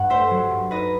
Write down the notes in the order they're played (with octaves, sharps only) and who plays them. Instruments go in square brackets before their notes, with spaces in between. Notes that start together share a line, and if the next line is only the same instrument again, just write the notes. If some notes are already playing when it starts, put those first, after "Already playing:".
Already playing: [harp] G2 F#5
A3 C5 E5
F#3
G2
D#4 B4 D#5